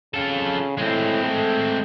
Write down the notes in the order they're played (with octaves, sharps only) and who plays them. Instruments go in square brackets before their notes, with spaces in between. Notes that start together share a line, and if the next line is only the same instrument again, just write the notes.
[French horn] C#3 [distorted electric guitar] F4 A4
[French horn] A2 [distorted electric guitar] G#3 C4
[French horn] A3